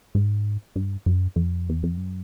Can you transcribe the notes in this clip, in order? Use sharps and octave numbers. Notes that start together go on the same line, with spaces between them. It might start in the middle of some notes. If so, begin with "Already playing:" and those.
G#2
G2
F#2
F2
E2
F2
F#2